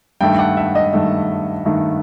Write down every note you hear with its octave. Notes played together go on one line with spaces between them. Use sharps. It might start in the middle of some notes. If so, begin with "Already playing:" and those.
G2 D#3 A3 G5
F#5
E5
D#5
G2 D#3 A3
G2 D#3 A3